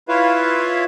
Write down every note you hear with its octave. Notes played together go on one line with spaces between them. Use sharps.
E4 F4 B4 C#5 E5 F5